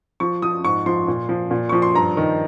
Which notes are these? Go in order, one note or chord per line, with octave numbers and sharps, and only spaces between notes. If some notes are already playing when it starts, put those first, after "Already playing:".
F3 C#6
F3 D#6
G#2 C#6
F3 C6
A#2
F3
A#2
F3 C#6
C6
G2 A#5
D#3